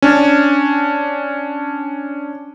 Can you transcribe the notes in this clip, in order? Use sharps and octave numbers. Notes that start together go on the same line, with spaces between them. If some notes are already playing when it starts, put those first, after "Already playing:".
C#4 D4